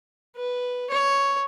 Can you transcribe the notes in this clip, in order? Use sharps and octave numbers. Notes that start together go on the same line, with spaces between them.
B4
C#5